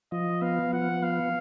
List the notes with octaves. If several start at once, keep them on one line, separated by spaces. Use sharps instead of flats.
F3 D#5
B3 F5
F3 F#5
B3 F5